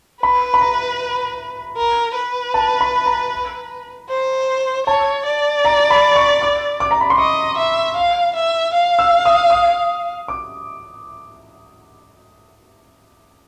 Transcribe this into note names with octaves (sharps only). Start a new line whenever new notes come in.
B4 B5
B5
A#5
A#4
B4
A5
B5
A#5
C5
C#5 A5
D5
A#5
B5
C#6
D6
D6
A#5
B5
C6
D#5 C#6
E5
F5
E5
F5
E6
D#6
D#6
D6